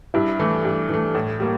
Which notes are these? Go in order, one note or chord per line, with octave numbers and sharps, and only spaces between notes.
G2 E4
E3 A3
G2
E3 A3
A2
G3 A#3